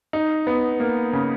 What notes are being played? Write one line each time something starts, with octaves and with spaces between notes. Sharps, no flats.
D#4
B3
A#3
C#3